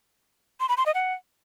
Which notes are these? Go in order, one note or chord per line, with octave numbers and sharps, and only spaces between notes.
C6
B5
C6
D#5
F#5